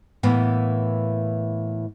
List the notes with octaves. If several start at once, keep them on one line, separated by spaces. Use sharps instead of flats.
A2 E3 A#3 B3